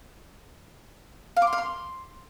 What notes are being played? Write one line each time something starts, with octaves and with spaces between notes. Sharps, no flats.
F5
D6
C6
F5
C6